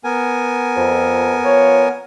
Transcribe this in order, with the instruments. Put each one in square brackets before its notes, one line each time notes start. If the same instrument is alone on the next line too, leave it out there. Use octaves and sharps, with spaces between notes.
[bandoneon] B3 A#4 G#5
[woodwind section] F2
F3 C#5